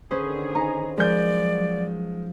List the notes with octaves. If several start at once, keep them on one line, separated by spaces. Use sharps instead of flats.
D3 D#3 C#4 G#4 B4 C5 D#6
D#4 G#5 A#5
F3 F#3 G#3 A#4 D5 G6